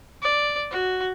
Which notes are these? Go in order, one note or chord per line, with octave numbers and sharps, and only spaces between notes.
D5
F#4